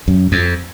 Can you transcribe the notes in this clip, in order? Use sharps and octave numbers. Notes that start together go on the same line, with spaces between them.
F#2
F2